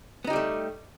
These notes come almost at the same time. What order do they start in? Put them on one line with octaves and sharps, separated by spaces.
B3 D#4 G4 G3 A3